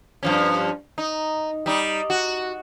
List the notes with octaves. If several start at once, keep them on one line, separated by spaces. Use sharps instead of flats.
G2 F3 C#4
D#4
G3 D#4
F#4